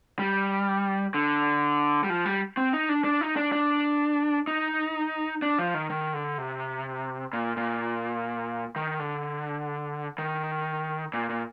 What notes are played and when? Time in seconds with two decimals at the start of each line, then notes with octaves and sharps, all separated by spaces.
0.19 G3
1.14 D3
2.04 G3
2.10 F3
2.26 G3
2.57 C4
2.73 D#4
2.89 D4
3.04 D4
3.21 D#4
3.36 D4
3.52 D4
4.47 D#4
5.42 D4
5.59 F3
5.74 D#3
5.90 D#3
6.14 D3
6.38 C3
7.33 A#2
7.57 A#2
8.76 D#3
8.99 D3
10.18 D#3
11.14 A#2
11.29 A#2